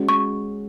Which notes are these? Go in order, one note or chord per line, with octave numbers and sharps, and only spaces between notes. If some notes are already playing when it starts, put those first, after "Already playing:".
Already playing: G#3 C#4 F#4
C#6